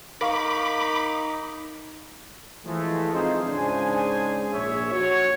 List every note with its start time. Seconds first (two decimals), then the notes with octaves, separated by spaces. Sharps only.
0.21 D#4 A#4 F5 B5 C#6 D6
2.66 E3 F3 G#3 A3
3.13 C4 D#4 F4 G#4 C5
3.46 G#2 C#3 D4 G#4 C5 G#5
4.53 A#1 C#5 E5
4.92 F#4 C#5